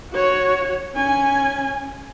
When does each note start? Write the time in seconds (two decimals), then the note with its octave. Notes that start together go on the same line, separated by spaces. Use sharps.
0.11 F#4 C#5
0.94 C#4 G#5